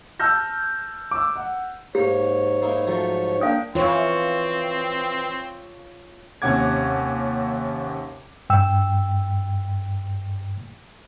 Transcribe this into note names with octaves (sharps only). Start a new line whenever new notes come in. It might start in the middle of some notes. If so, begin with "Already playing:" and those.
A5 E6 F6 G6 A#6
D6 E6
F#5
G#2 A#3 G4 C#5
A#3 D#4 E4
F3 F#3 A3
A#3 D4 F5 G5 D#6
E3 C4 F4 C#5
D#2 C3 C#4 F#5 D6 G#6
G2 G5 E6